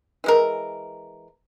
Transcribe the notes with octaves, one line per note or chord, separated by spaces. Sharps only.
E3 G#3 A#4